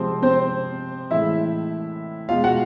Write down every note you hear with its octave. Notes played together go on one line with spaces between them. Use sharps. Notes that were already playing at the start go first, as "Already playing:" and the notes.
Already playing: C3 F3 G#3 C4 C5
C4 C5
A2 E3 G#3 E4 E5
B2 G#3 F4 F5
F#4 F#5